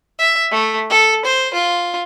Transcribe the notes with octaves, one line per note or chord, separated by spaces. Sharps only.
E5
A3
A4
C5
F4